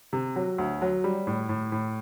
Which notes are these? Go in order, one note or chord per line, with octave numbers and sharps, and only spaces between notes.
C3
F#3
D2
F#3
G3
A2
A2
A2